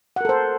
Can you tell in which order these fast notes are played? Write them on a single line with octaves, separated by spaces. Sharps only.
F#5 A#4 A4 C5